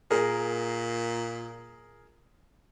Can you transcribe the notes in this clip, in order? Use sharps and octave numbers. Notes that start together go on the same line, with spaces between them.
A#2 G#4 A#4